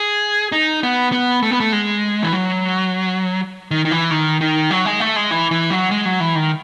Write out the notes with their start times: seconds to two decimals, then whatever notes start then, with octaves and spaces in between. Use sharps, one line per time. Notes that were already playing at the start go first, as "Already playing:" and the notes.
Already playing: G#4
0.52 D#4
0.83 B3
1.12 B3
1.43 A3
1.51 B3
1.60 A3
1.73 G#3
2.23 E3
2.32 F#3
3.71 D#3
3.85 D#3
3.91 E3
4.11 D#3
4.41 D#3
4.71 F#3
4.85 G#3
5.00 A3
5.16 G#3
5.31 E3
5.51 E3
5.70 F#3
5.91 G#3
6.05 F#3
6.20 E3
6.35 D#3